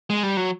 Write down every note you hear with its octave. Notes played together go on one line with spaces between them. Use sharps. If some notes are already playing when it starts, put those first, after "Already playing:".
G#3
G3
F#3